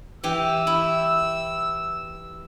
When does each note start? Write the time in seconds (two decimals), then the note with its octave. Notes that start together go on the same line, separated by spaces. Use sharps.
0.24 E3 G4 E6
0.67 E4